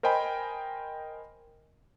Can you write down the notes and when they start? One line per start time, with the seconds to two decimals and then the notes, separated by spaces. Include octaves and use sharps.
0.03 A#4 C5 D#5 G5 G#5 B5